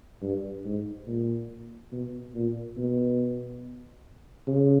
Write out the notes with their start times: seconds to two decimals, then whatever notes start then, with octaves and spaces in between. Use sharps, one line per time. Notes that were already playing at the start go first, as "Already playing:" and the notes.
0.22 G2
0.65 G#2
1.07 A#2
1.92 B2
2.34 A#2
2.77 B2
4.48 C#3